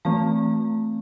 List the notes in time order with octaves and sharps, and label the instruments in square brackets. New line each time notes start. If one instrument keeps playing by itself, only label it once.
[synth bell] E3 A3 C4 A5